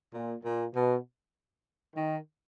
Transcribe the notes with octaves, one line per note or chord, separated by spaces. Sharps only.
A#2
A#2
B2
D#3